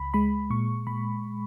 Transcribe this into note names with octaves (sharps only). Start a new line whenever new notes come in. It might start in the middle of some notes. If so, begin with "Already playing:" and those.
Already playing: C#2 B5
G#3 B5
A#2 C#6
A#2 B5